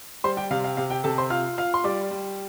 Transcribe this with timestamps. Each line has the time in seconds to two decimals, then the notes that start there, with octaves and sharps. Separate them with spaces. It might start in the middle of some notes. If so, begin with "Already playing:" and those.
0.24 G3 C5 C6
0.37 G4 G5
0.51 C3 F5
0.64 F5
0.77 C3 F5
0.90 G4 G5
1.04 C3 A4 A5
1.18 C5 C6
1.30 F4 F5 F6
1.58 F4 F5 F6
1.74 C6
1.84 G3 D5 D6
2.11 G3